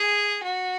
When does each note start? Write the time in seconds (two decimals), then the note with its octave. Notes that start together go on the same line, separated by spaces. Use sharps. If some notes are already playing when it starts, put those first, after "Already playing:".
Already playing: G#4
0.43 F#4